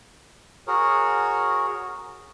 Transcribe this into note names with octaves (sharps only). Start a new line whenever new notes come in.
F#4 G#4 A#4 C#5